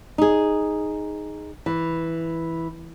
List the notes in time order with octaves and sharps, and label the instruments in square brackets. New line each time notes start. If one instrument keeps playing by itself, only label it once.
[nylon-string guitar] D#4 G#4
E3